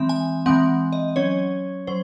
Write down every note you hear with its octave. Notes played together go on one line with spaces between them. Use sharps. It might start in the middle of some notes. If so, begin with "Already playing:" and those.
Already playing: E3 G#3 C4 E5
G#5
E3 G#3 C4 F#5
D#5
F#3 C#4 C#5
F#3 C5